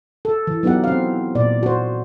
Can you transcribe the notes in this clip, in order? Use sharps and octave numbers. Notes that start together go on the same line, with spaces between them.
A4
E3
F#3 B3 D#4 G4 F#5
C4 F5
A#2 D5
F#4 C5